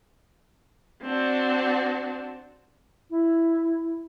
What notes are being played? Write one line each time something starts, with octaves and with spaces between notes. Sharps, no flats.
C4 D4 F#4
E4